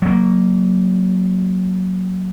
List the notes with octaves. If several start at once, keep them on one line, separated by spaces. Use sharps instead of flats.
F#3 A#3